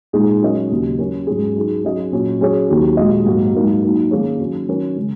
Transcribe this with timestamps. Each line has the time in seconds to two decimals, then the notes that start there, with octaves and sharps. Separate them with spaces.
0.13 A#2 G#3 D#4 G#4
0.42 F#3 C#4 A#4 D#5
0.70 D#2 C#3 F#3 A#3
0.99 F#3 C#4 A#4
1.27 G#2 F#3 C#4 G#4
1.55 F#3 D#4 G#4
1.84 F#3 C#4 G#4 D#5
2.12 A#2 F#3 C#4
2.40 F#3 C#4 G#4 C#5
2.69 D#2 D#3 F#3
2.97 A#2 G#3 F#4 D#5
3.26 G#2 F#3 A#3 F#4
3.54 G#2 F#3 A#3 D#4 A#4
3.82 F#3 A#3 D#4
4.11 D#3 A#3 C#4 G#4 C#5
4.40 D#3 F#3 C#4
4.68 D#3 F#3 C#4 A#4
4.96 C#3 G#3